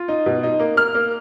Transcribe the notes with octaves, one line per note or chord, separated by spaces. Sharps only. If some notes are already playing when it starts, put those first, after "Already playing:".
Already playing: F4
D#4
B2
D#4
A#3
A#3 F6
A#3